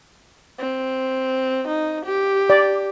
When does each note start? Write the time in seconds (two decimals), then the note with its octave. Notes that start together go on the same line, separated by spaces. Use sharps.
0.59 C4
1.68 D#4
2.06 G4
2.50 D5